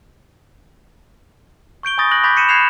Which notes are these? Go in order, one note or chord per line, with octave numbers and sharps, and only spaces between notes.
C#6 G6 D7 G7
G#5 B5 C#6 D#6 A6 A#6
F#6 A#6 F#7
B5 C#6 D6 G6 A6 B6
D#6 B6 C#7 D#7 E7
F#6 G#6 C7 C#7 E7 F7